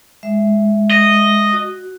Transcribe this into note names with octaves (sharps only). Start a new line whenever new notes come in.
G#3 E5
D#5
F#4